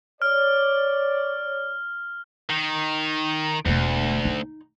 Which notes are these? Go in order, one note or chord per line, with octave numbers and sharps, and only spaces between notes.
C#5 D5 F6
D#3
E1 D2 A3
D#4